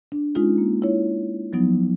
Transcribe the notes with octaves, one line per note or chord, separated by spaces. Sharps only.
D4
G#3 C#4 D#4 F4 G#4
A#3
E4 C#5
F3 F#3 B3 D#4